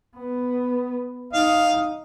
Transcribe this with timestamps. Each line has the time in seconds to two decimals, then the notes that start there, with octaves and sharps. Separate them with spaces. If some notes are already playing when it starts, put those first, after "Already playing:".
0.16 B3
1.33 D#4 F5